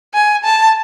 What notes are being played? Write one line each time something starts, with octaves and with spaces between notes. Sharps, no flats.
G#5
A5